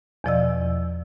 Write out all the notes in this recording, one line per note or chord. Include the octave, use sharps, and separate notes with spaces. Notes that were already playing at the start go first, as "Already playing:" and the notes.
E2 B2 F3 D5 D#5 E6